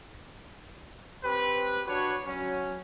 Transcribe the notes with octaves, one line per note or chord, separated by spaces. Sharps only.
C4 G4 B4
D4 F#4 B4 C#5
F#3 C#4